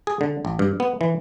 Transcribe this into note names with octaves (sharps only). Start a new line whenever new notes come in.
G#4
D3
A1
G2
B3
E3